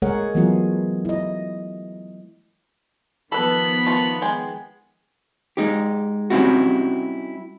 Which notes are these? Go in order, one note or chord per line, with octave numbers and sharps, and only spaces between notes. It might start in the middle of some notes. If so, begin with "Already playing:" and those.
G#3 A3 G#4 A#4 C#5 F#5
E3 F#3 A3 B3 F4 G#4
E4 D#5
D#3 F3 B3 A4 B4 B5
A3 F4
G#3 G5
G#3 D#4 G4
G3 C4 C#4 D#4 E4 F#4